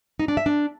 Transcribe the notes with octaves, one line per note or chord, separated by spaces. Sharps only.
D#4
D4
E5
D4